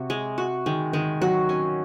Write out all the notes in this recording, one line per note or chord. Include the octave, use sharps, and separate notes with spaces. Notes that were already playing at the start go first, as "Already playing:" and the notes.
Already playing: C3 F#4
G#3
F#4
D#3 G#3
D#3 G#3
F#3 F#4
C#4